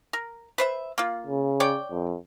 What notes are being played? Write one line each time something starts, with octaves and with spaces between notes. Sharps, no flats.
A#4
B4 C5 E5
A#3 F4
C#3
C#5 D5 G5
F2